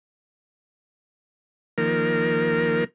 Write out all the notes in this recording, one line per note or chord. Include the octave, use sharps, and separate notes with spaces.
D#3 F3 A#3 A#4